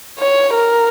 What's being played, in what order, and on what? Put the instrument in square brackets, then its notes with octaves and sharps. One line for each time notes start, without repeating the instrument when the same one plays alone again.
[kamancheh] C#5
A#4